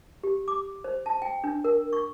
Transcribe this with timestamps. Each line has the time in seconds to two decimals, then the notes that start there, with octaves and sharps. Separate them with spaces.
0.23 G4
0.48 D6
0.84 C5
1.06 A5
1.22 G5
1.44 D4
1.64 A#4
1.93 C#6